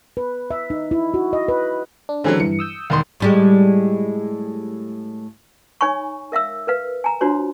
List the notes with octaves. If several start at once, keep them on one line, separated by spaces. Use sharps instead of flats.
B4
E5
D#4
E4
F#4
D#5
B4
D4
D3 E3 F#3 G#3 C4 C#4
G2 E3 C#7
D#6 E6 G6
E1 D#3 C6
A2 G3 G#3
D#4 C#5 G#5 B5 C#6
A#4 E5 F5 E6
A#4 B4 F5
G#5 A#5
D4 F4 F#4 C5 C#5 C6